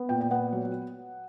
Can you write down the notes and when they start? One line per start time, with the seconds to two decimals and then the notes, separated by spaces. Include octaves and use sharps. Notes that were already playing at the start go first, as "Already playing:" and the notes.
Already playing: B3
0.09 A#2 G5
0.21 G5
0.31 B3 F#5
0.52 F#3